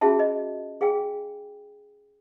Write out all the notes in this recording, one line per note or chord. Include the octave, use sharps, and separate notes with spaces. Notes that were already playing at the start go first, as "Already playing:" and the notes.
C#4 F4 F#4 G#4 E5 A5
D#5
G#4 F5 G5 G#5